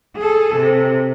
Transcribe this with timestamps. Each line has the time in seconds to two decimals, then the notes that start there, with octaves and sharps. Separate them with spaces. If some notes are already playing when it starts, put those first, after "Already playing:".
0.17 G#4 A4
0.56 C3